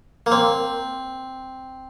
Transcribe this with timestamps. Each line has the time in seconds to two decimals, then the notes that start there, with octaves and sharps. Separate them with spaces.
0.26 A#3
0.32 C4